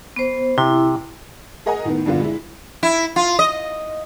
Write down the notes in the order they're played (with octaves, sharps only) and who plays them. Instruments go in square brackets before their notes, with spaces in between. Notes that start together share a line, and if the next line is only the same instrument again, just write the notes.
[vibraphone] B3 C5
[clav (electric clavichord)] C3 [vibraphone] E4
[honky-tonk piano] G#4 A#4 D#5 F#5 G#5 A#5
A2 D#3 B3
G2 A#2 D3 F3 B3 F4
G#3 E4
[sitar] E4
F4
D#5